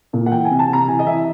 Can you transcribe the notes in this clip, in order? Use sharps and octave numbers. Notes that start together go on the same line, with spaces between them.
A#2
F#5
E3 G5
G#5
C3
A5
C3 A#5
E3 G#5
D#5
E3 E5